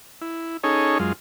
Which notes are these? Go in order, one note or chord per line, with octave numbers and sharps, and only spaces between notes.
E4
C#4 D#4 G#4 A4 C#5
F#2 G#3 F4